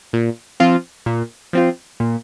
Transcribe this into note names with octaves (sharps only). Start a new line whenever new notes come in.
A#2
F3 C4 F4
A#2
F3 C4 F4
A#2